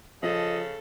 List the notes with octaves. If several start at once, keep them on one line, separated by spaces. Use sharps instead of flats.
C#3 F3 A4 D#5